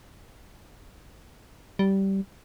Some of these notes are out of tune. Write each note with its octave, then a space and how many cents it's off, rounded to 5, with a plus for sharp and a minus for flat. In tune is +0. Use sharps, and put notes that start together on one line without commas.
G3 -15